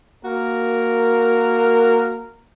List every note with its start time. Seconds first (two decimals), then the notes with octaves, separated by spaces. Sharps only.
0.25 A#3 F#4 A#4